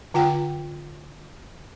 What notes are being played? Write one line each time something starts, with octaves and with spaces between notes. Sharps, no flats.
D3 F4 F#5 G5